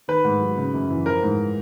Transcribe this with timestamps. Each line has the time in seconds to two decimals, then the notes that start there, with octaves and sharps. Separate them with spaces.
0.08 D#3 B4
0.25 G#2
0.41 F#3
0.58 C#3
0.74 F#2
0.90 E3
1.06 F3 A#4
1.23 G#2